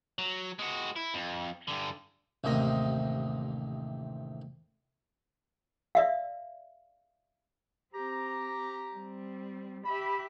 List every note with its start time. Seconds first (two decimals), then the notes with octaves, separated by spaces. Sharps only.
0.18 F#3
0.59 G#3 F#4
0.96 E4
1.14 F2
1.68 G2 D3
2.44 A1 D#2 C3 D#5
5.95 D5 E5 F5
7.95 C4 G4 A#5
8.95 G3 C4
9.85 G4 E5 B5